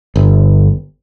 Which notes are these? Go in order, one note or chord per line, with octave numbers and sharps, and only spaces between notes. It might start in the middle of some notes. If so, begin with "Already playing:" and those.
G1